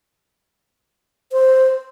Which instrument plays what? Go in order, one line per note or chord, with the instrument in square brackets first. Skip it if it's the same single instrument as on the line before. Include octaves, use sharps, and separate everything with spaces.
[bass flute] C5